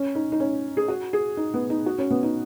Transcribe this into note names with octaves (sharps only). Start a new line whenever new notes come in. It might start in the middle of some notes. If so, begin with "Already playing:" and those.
Already playing: C#4
D#4
D#4
C#4
G#4
F#4
G#4
D#4
B3
D#4
F#4
C#4
B3
D#4